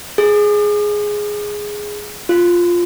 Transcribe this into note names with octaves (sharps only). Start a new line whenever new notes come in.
G#4
F4